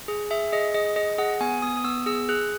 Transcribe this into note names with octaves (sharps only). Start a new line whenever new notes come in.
G#4
G#4 E5
G#4 D#5
G#4 D#5
G#4 D#5
G#4 F#5
B3 G#5
B3 D#6
D#6
B3 E6
G#4 E6
G#4 F#6